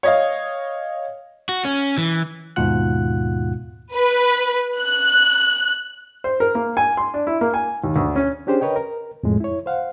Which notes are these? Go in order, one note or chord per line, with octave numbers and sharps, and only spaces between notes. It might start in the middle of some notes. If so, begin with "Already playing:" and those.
C#5 D#5 F5
F#4
C#4
E3
D#2 G#2 B2 F4 F#5 F#6
B4
F#6
C5
A#4
A#3
G#5
C6
D4
E4
A#3
G#5
D#2
D2
C#4
C#4 D4 G4 G#4 C5
A#4 B4 C#5 D#5 G5
A#4
F2 A2 G#3
E4 C#5
C5 F5 F#5